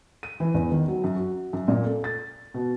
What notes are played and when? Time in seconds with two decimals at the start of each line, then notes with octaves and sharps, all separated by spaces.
0.23 D#7
0.40 E3
0.54 E2
0.72 D#3
0.88 F#3
1.04 F#2
1.16 F#4
1.53 F#2
1.68 A#2
1.84 A4
2.04 A6
2.54 B2